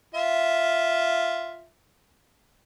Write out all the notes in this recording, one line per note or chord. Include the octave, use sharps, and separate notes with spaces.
F4 E5